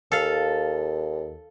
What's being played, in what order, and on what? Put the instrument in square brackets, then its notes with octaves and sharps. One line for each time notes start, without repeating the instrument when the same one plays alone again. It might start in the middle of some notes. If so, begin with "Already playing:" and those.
[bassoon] D#2 [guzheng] A4 F5